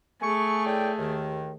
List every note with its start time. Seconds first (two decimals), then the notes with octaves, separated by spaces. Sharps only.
0.22 A3 G#4 G#5 C#6
0.65 A2 D5 G5
0.98 D#2 D#3